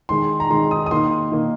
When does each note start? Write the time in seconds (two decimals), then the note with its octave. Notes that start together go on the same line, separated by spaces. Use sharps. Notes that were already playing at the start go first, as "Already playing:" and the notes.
0.09 D#3 G#3 C6
0.40 A#5
0.50 D#3 G#3 C6
0.71 D#6
0.86 D#6
0.91 D#3 A#3 C6
1.32 D#3 A#3